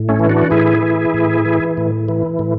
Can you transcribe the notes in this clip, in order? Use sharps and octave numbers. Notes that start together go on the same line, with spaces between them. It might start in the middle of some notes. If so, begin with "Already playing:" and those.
Already playing: A2
A3 C#4
E3
D4 F#4
A2 E4 G#4
E3
A2
E3
A2
E3
A2